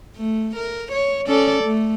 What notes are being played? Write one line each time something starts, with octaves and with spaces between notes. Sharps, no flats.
A3
A#4
C#5
C#4 A4 D5
A3